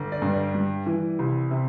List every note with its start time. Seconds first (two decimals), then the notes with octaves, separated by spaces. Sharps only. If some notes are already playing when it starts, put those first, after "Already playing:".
Already playing: G1
0.12 D5
0.22 G2
0.33 D5
0.55 G3
0.86 E3
1.19 C2
1.51 C3